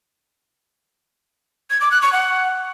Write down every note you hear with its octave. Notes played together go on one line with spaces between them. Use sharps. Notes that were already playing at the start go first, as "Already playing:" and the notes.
G#6
D6
F#6
C#6
F#5